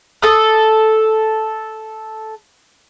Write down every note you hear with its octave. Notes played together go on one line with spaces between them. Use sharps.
A4 D#6